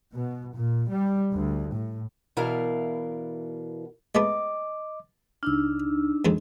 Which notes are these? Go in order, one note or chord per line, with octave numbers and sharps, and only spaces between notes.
B2
A#2
G3
D2
A2
B2 E3 E4 A#4 D5 F5
G#3 A3 B3 D#5 D6
C#2 D4 D#4 E6 F6
F2 D#3 G#3